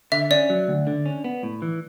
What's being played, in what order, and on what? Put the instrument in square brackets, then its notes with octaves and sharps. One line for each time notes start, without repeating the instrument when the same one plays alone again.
[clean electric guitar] D3 [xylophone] E5
[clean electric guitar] C#4 [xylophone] D5
[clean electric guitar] F#3
D2
D3
C#4
B3
A2
E3